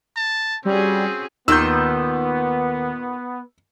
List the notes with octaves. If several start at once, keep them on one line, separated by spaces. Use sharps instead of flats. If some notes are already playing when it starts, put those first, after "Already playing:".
A5
G3 C4 C#4 F#4 G#4
D#2 A#2 D#3 B3 D#4 A#4 E6 G6